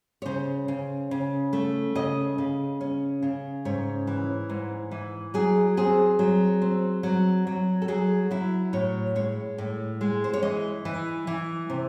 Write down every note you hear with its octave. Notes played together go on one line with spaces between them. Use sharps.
C#5
C#3 C5
C#3
C#3
A3
C#3 D#5
C#3
C#4
C#3
G#2 C#5
E3
G#2
E3
F#3 G#4
C4 G#4
F#3
C4
F#3
F#3
A4
F#3 G#4
F#3 E4
A2 C#5
G#3 C#5
A2
G#3
C5
C#5
E3 D#5
E3
E3
C3